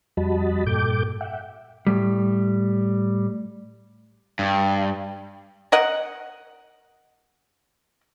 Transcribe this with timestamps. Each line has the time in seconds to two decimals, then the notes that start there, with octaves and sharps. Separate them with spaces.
0.17 F2 G3 F#4 D#5 A5 B5
0.67 G2 A#2 A4 G5 D6 G6
1.21 E5 F#5 G5
1.87 A2 G3
4.39 G2
5.72 A#4 D#5 F#5